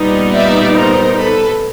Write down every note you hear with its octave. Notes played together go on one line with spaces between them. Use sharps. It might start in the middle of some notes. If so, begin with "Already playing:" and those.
Already playing: A#2 G3 B3 D#4
D5 E5
A#4 C5
A4 B4